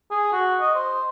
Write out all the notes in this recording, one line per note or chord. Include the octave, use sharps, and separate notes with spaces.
G#4
F#4
D#5
C5